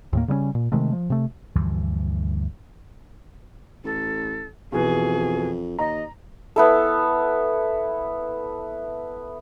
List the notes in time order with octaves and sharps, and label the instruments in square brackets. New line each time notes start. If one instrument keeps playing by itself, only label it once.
[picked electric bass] D#2 A2 A#3
C#3 G3 A#3 C#4
A#2
C3 D#3 G#3 A3
F3
C3 A3
[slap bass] D2 G2 E3 F3
[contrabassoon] A1 [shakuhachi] A4
[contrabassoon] F2 [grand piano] B2 E3 [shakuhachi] G#4
[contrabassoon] D#2 [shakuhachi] D#5 [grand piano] A#5
[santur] B3 E4 A4